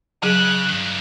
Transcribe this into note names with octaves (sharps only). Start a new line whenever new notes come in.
C#3 F#3 G#4 F#6
G2 D#3